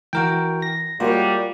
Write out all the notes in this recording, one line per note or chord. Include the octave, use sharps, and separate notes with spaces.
E3 F#4 A#4 G5
A#6
G3 G#3 A#3 F4 F#4 A#4 C#5